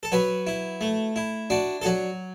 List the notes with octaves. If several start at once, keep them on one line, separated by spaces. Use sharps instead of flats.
A4
F#3 F#4 B4
E4
A3
E4
D4 F#4
A4
F#3 F#4